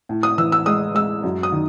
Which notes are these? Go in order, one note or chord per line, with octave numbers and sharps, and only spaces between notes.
A2
D#6
E3 E6
E6
G#3 D#6
G#3 E6
F#2
D#6
D#3